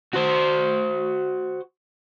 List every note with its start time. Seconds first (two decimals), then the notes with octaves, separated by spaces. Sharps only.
0.13 F#4 C5